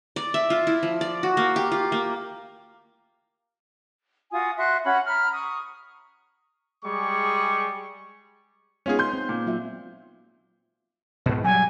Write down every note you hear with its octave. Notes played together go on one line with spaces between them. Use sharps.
D5
E5
F4
E4
F3
D5
F#4
A#3
G4
F4
A#3
F4 F#4 G#5 D#6
F#4 E5 C6 F#6
C#4 F#4 F#5 B5
A#5 B5 F6
C#6 D#6
G3 G#3 G#4 C#6 D6
G#3 B3 C#4 D#4 F4 G#4
C6 G6
C4 D#4
A#2
F#3 F4 E5
G#2 B2
F#3 G3 G#5